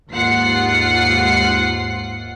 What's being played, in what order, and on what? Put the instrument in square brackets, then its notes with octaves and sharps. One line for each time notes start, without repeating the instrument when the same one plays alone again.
[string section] D#2 G#2 F4 F#5 C7